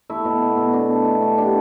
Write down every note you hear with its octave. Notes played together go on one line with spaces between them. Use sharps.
A3 E4
B2
B2
B2
B2 D4
A3
B2 E4
A3
B3 D4 G4